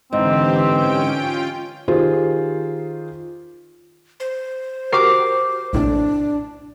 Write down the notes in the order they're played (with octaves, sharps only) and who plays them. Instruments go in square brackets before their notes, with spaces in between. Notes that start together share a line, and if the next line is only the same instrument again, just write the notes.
[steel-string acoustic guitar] G#2 [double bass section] D3 E3 [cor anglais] C4 [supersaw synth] G4
[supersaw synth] C#4 G5 D7
F4 G5
[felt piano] D#3 F4 G4 G#4 C5
[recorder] C5
[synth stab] F#4 G4 A#4 [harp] D6 C7
[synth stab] A#1 A2 C3 [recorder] D4